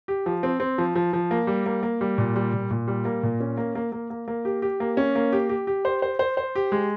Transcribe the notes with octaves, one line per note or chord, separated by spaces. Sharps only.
G4
F3
C4
C4
F3
F3
F3
A#3
G3
A#3
A#3
G3
A#2
G3
A#2
A#2
G3
A#3
A#2
C#4
A#3
A#3
A#3
A#3
A#3
G4
G4
A#3
C#4
A#3
G4
G4
G4
C5
C5
C5
C5
G4
G#3